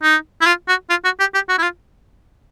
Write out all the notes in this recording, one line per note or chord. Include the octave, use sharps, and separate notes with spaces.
D#4
E4
F4
F#4
F4
F#4
G4
G4
F#4
E4
F4